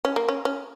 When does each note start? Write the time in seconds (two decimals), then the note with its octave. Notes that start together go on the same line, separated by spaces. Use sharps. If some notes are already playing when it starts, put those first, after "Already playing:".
0.05 C#4
0.16 A#3
0.29 C#4
0.45 C#4